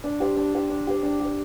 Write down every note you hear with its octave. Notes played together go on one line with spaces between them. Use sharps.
D4
G4 C5
D4
G4 C5
D4
G4 C5
D4
G4 C5